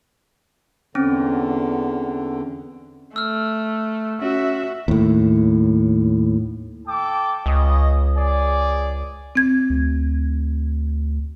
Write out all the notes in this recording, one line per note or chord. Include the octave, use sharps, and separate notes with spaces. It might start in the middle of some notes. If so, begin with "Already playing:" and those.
E2 D3 C4 C#4
A3 E6 F6
C#4 F#4 E5
D#2 A2
A4 G5 D6
C#2 C#4 D#5
G#4 D5
C4 G#6
D2